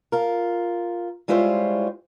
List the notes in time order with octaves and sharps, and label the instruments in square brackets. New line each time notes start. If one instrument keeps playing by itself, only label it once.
[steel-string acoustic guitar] F4 A#4
G3 G#3 E4 F4 C5 C#5